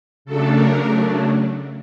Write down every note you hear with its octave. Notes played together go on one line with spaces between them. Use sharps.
C#3 F#3 A3 D4 A4
A#4